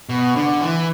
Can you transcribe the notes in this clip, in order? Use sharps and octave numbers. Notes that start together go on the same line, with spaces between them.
B2
D3
E3